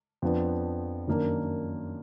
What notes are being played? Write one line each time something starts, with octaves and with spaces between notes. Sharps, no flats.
F2 F3 B3 D4
F#2 D#3 A#3 D4